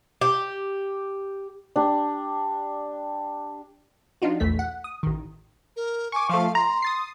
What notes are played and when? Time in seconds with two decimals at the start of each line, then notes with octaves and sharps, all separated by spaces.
0.21 G4
1.76 D4 G4
4.22 F3 D4 D#4 F4 F#4
4.40 A#1 E2 A3 B6
4.59 F#5
4.84 D#6
5.03 A1 D#3
5.76 A#4
6.12 G#5 C#6 D6
6.30 F3 A3 F5
6.55 A#5 C6
6.82 D#6 A6 C7